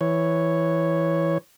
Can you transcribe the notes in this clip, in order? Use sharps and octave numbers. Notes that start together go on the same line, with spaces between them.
E3 C#5